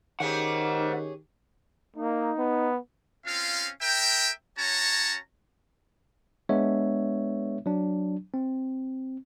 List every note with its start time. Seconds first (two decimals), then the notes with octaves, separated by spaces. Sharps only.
0.20 D#3 C#4 G4 G#4 C5 F#5
1.96 A#3 D#4
2.38 B3
3.26 C4 C#4 F4 F5
3.82 A#4 E5 G5
4.58 C#4 F#4 C#5 A5 A#5
6.49 G#3 B3 D4 C#5 E5
7.66 F#3 D4
8.34 C4